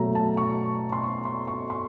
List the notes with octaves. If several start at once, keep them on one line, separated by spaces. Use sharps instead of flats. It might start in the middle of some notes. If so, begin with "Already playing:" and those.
Already playing: B2 F#3 A3 A#5
A5
C#6
C6
C#6
C6
C#6
C6